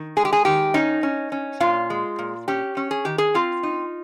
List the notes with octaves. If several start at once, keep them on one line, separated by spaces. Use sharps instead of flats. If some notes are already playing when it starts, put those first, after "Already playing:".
Already playing: D#3
G#3 G#4
G4
G#4
D#3 G4
C#4 D#4
C#4
C#4
A#2 F4
G#3
A#2
C#4 G4
C#4
G#4
D#3 G4
G#4
C4 F4
D#4